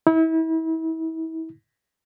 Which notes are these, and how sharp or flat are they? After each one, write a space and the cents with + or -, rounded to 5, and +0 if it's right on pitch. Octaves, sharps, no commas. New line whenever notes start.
E4 -35